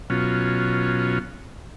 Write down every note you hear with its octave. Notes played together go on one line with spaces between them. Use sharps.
B2 F#3 C#4 F4